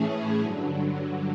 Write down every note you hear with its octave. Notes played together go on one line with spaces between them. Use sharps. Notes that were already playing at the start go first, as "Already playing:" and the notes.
Already playing: A2 E3 A3 C#4 G#4
G2 D3 F#3